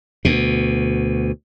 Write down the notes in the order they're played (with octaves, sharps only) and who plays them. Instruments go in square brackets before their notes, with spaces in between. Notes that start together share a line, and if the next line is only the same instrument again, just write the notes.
[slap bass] D2 B2